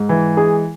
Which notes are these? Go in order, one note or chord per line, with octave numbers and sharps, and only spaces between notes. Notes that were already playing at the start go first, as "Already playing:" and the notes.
Already playing: G#2
E3
G#3 G#4